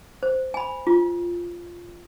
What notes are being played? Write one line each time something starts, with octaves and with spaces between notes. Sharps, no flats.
C5
G#5 B5
F4